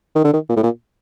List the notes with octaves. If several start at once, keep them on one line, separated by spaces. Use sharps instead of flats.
D#3
D3
D#3
A#2
A2
A#2